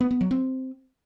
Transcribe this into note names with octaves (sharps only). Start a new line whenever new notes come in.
B3
B3
F#3
C4